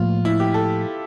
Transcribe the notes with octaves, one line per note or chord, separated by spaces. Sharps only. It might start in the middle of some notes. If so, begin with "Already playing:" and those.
Already playing: A2 F3 A#3 F4
E4
G4
A4